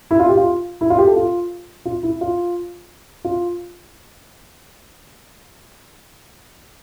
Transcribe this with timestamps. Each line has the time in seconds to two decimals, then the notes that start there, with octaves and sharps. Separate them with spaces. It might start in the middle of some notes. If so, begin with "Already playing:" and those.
0.11 E4
0.20 F4
0.29 G4
0.37 F4
0.81 E4
0.90 F4
0.99 G4
1.07 A4
1.16 F4
1.85 F4
2.03 E4
2.21 F4
3.25 F4